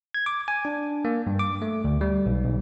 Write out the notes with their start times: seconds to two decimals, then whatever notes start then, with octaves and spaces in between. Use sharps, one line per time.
0.14 G#6
0.26 D6
0.48 G#5
0.65 D4
1.05 A#3
1.27 G2
1.39 D6
1.62 A3
1.84 D2
2.01 G3
2.26 B1
2.45 B1